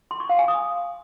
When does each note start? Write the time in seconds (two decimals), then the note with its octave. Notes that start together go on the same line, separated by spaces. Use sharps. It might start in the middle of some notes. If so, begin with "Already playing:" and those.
0.11 C6
0.20 C#6
0.29 F5
0.39 G#5
0.48 D#6